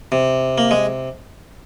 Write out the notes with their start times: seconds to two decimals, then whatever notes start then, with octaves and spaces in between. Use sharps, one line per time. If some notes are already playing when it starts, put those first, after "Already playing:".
0.12 C3
0.58 A#3
0.71 G#3